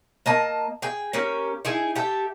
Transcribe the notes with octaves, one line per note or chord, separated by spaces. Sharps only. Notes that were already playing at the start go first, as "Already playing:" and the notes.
A#3 D#5 A5
G#4 G5
A#3 C#4 G4
D#4 E4 G#4
G4 A4 E5 G5